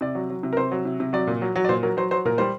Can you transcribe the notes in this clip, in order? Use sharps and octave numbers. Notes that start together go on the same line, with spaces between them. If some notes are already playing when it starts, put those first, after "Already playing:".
C3 D5
F#3
F#3
C3
A#4
C3 C5
F#3
C3
C3
F#3 D5
A#2
F#3
F#3
D5
A#2 C5
F#3 A#4
F#3 C5
F#3 C5
A#2 A#4
G3 C5